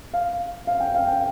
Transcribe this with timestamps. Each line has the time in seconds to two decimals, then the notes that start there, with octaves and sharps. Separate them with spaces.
0.14 F5
0.67 F5
0.80 G5
0.95 F5
1.08 G5